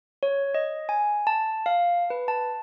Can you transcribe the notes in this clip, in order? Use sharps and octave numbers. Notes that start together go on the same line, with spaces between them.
C#5
D#5
G#5
A5
F5
B4
A5